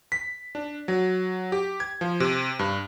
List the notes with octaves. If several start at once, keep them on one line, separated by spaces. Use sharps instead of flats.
B6
D4
F#3
G4
G#6
F3
C3
G2